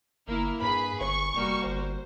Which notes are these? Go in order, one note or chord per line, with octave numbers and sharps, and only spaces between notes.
G1 A#3 E4 A#4
G2 G#4 B4 B5
G1 C#6
F1 G3 A#3 F#4
G1 C5